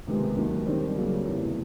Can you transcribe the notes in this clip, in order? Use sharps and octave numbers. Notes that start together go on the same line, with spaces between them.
C#2 C3 D#3 G#3 B3
D#2 D#3 F#3
D#3 G3 C4
C#3 F#3 A#3
E2 C3 E3 A3